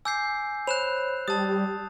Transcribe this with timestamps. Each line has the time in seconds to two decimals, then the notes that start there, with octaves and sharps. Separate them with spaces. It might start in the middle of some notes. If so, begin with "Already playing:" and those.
0.05 G#5 D6 E6 G6 C7
0.67 C5 C#5 B5 F#6 E7 F7
1.28 G3 A5 D#6 A6